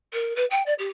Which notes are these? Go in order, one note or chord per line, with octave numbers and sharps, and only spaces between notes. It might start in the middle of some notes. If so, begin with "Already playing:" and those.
A#4
B4
G5
D5
G4